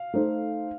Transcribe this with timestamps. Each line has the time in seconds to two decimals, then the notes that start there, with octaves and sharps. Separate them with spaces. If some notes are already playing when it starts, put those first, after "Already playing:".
Already playing: F5
0.14 A3 D#4 A4 C5